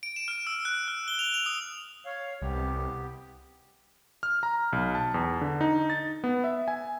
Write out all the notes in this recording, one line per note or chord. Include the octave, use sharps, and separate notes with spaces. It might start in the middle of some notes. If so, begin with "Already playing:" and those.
D7
E7
F6
E6
F#6
F6
G7
F7
F7
D#6
C#5 F5
C2 B3 G4
F6
A#5
B1
A5
E2
D3
D#4
A6
B3
E5
G#5